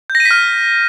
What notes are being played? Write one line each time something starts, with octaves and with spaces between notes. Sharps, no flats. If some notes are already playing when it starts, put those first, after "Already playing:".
G6
A#6
D#7
B6
F6